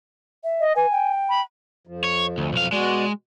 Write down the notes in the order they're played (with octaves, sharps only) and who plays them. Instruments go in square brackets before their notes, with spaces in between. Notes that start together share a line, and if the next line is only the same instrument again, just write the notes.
[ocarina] E5
[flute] D#5
[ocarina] B4 [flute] G#5
[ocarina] G5
[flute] B5
[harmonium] F2 F3
[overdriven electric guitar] C#5
D2
B1 F5
[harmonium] B2 F#4 D5 [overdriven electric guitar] G#3